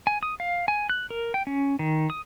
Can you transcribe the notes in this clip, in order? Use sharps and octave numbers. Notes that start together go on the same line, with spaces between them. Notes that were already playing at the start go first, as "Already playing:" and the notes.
G#5
D#6
F5
G#5
F#6
A#4
G5
C#4
D#3
D#6